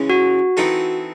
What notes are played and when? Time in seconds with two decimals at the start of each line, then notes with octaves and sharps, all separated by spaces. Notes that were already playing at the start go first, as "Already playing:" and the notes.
Already playing: C#3 E3 G#3 C#4
0.10 F#4
0.57 E3 C4 D#4 A4